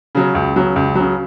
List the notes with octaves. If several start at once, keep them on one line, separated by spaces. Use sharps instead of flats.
C#3 F#3
C#2
C#3 F#3
C#2
C#3 F#3